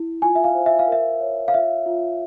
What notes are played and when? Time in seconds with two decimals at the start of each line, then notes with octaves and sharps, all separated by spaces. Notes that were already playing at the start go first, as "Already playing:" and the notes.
Already playing: E4
0.22 F4 G#5
0.35 E5
0.44 F5
0.54 C5
0.66 E5
0.79 F5
0.88 A#4 E5
1.20 C#5
1.48 F5
1.54 F4 E5
1.86 F4